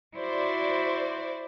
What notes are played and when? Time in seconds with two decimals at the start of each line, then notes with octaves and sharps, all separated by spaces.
0.16 E4 F#4 C5 D5